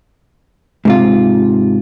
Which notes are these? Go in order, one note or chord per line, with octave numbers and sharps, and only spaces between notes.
G#2 C3 F4